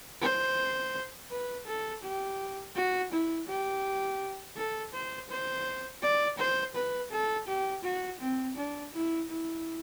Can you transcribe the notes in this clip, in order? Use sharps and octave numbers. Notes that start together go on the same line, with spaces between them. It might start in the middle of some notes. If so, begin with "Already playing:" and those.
C5
B4
A4
G4
F#4
E4
G4
A4
C5
C5
D5
C5
B4
A4
G4
F#4
C4
D4
E4
E4